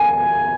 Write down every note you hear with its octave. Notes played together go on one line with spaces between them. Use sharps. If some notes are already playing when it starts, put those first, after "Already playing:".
Already playing: G#5